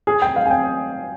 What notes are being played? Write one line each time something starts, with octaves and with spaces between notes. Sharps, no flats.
G#4
G5
F5
G#5
G5